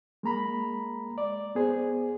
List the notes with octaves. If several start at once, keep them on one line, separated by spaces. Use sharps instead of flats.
G#3 A#3 A#5 B5
D5
B3 G#4 C5